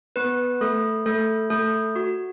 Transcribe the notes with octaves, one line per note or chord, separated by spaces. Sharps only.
B3 B4
A3 A4
A3 A4
A3 A4
F#4